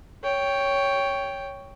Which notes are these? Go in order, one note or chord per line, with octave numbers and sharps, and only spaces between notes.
C#5 G5